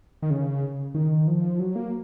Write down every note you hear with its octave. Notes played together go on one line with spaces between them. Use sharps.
D#3
C#3
D#3
F3
F#3
A#3